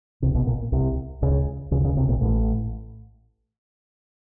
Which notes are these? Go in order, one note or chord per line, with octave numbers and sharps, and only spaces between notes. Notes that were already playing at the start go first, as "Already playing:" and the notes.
C2 C3
B1 B2
A#1 A#2
C2 C3
C#2 C#3
C#2 C#3
C#2 C#3
C2 C3
A#1 A#2
A1 A2